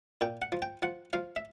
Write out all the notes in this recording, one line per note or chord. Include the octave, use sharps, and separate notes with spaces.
A#2 G5
F#5
F3
G5
F3 F#5
F3 F5
E5